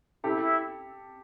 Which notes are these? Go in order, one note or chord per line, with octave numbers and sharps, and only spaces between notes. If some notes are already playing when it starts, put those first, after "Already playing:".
E4 G4 A4
E4